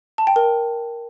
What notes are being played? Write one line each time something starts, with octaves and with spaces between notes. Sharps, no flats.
A5
G5
A#4